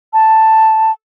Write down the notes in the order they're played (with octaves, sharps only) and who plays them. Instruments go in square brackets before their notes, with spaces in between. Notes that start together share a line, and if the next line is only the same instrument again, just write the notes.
[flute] A5